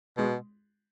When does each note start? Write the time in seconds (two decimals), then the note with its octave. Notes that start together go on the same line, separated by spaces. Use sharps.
0.18 B2 G#3